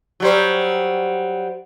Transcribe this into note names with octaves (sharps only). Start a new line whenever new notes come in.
F#3 G3 C5